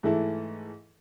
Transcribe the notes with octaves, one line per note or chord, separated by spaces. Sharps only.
G#2 E3 A3 E4 A4